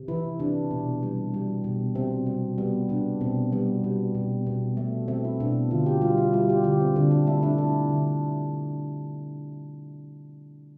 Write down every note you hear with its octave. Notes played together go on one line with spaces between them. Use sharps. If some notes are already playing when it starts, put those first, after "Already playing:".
Already playing: C3
E3 E4
C3 D4
B2
G3
G3
B2
C3 C4
G3
G3 B3
C3 D4
B2 C4
G3 B3
G3
B2
B2
A3
A3 C4
E4
B2 D4
D3 F4
G4
G3 F4
E4
G3 F4
G4
D3 G4
C4
D3 D4
D4
A3 E4
D4
A3 E4
D3